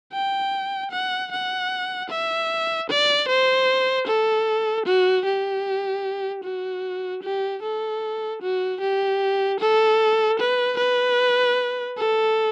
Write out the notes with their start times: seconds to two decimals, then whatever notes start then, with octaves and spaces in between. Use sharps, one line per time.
0.13 G5
0.91 F#5
1.32 F#5
2.09 E5
2.90 D5
3.28 C5
4.07 A4
4.86 F#4
5.25 G4
6.43 F#4
7.22 G4
7.62 A4
8.42 F#4
8.80 G4
9.60 A4
10.39 B4
10.77 B4
11.97 A4